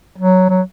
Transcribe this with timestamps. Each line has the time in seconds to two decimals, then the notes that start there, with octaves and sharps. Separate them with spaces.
0.18 F#3
0.50 F#3